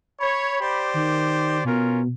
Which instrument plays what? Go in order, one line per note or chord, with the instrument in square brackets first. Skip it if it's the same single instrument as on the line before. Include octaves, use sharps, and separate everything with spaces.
[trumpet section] C#5 [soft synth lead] B5
[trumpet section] G4 C5 D5
[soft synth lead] D#3
[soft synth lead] B2 [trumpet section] C#4 F4 A#4